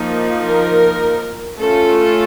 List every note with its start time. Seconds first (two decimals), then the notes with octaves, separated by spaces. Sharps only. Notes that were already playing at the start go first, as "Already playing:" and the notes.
Already playing: F3 A#3 D#4
0.46 A#4
1.59 A3 C#4 F4 A4